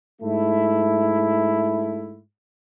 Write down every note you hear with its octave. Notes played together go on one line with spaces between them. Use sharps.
G#2 A3 E4